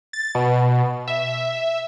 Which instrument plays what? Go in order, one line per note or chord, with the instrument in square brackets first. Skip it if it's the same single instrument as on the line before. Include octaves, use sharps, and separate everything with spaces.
[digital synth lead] A6
B2
E5